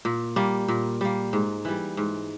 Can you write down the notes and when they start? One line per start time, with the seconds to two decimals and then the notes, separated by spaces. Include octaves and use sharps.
0.05 A#2
0.36 G3 A#3
0.68 A#2
1.01 G3 A#3
1.33 G#2
1.65 E3 G3
1.97 G#2